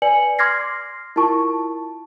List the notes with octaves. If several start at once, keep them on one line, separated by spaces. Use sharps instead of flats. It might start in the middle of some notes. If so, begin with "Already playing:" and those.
B4 D5 G#5 C#7 F#7
C6 D6 F6 G#6 A#6 C7
E4 F4 A#4 A5 C#6